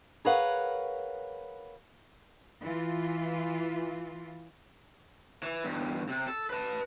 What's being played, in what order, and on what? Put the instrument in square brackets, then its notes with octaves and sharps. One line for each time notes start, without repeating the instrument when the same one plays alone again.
[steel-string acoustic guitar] G#4 A#4 B4 C#5 F5 F#5
[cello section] E3 F4
[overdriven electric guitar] E3
E2 G2
C3
A4
B4 A5